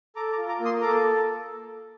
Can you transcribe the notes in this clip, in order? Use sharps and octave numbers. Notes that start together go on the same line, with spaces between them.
A4 A#5 D6
A#5 D6
F4
A#5 D6
A#3
C6 D#6
A4 A#5 D6